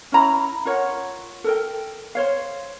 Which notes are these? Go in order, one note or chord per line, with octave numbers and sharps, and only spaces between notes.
C#4 E4 A#5 B5
F4 A#4 C#5 F#5
A4 A#4 G5
C5 C#5 F5